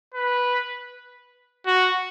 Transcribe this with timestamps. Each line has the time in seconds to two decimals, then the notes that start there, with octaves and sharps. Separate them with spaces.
0.14 B4
1.66 F#4